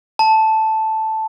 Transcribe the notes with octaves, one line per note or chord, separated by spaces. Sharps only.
A5